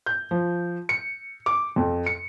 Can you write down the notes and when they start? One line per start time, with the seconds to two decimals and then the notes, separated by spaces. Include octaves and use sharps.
0.06 G6
0.31 F3
0.89 C#7
1.46 D6
1.76 F2
2.06 C#7